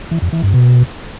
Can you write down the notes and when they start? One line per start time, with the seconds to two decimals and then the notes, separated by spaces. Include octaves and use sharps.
0.11 E3
0.22 F2
0.33 E3
0.43 G2
0.54 B2